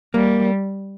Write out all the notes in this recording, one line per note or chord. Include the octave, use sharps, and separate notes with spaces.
G3 A#3